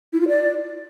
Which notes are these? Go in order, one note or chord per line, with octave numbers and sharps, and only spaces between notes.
E4
F4
D5